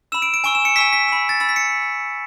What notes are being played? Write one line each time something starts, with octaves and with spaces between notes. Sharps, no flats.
B5 E6 E7
D7
D7
G#5 C#6 E6 D7
E7
C#7
G#5 C#6 E6 B6
B6
B5 E6
A6
B5 E6 A6
B6
C#7